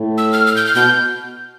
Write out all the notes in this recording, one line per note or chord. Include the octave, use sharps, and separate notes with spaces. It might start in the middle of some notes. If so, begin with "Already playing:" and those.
Already playing: A2
E6
F6
F6
G6
F6
B2 G6